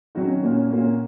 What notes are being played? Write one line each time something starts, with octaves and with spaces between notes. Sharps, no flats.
D#3 F#3 C#4 F#4
A#2 A#3 C#4
A#2 A#3 C#4 F#4